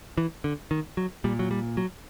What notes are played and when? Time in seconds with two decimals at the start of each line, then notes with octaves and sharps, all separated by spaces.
0.18 E3
0.44 D3
0.71 D#3
0.97 F#3
1.24 A#2 G3
1.39 F#3
1.51 G3
1.77 F#3